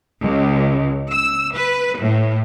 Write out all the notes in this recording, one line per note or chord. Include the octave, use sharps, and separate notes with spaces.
C#2
E6
B4
A2